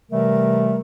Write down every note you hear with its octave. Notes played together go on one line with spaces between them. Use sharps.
C3 E3 G3 A3 A#4